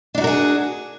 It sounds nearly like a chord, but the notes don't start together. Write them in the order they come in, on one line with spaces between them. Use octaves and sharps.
D4 D#4 F#4 A#4 G#4